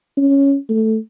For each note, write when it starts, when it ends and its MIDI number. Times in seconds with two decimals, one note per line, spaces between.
0.17 0.56 61
0.69 0.97 57